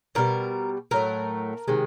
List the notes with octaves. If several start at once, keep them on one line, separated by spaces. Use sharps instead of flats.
B2 G3 A#4
A2 F#3 A3 A#4
C3 D#3 G#3